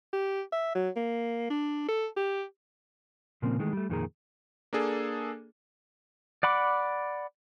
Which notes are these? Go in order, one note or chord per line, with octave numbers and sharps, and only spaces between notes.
G4
E5
F#3
A#3
D4
A4
G4
A#2 C#3 F3 A#3 C4
D#3 E3 G#3 A3
G3 A3
F2 A#2 D#3 A#3 G#4 A#5
A#3 D4 G#4 A4
D5 F#5 B5 D6